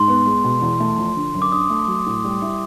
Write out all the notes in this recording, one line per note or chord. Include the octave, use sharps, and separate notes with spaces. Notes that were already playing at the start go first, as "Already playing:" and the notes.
Already playing: G#2 C6
B3
G#3
B2
E2
A3
F3
D3
F#2
D6
D4 D#6
A3
F#3
A2
G3
E4